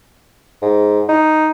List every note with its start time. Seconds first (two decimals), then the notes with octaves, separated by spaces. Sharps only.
0.62 G#2
1.09 D#4